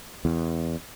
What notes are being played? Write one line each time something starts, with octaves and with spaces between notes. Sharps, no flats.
E2